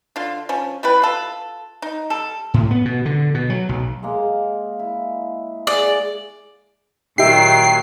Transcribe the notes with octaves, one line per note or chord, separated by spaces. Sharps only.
D3 F4
F3 C#4
G3 E4 B4
F4 A4
D#4
G3 A4
A2
B3
B2
D3
B2
F#3
B1
G#3 A#3
E4
G#4 D5
A#2 D#3 F#3 D#4 G4 E5 G5 C7